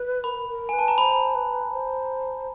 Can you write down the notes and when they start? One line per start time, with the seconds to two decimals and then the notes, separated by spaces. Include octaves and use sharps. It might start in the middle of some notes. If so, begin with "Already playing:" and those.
Already playing: B4
0.24 A#4 B5
0.49 A#4
0.69 B4 G#5
0.79 A5
0.88 A#5
0.98 C5 B5
1.35 B4
1.72 C5